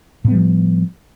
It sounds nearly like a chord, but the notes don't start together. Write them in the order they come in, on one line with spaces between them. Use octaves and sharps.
A2 B3 G3 F3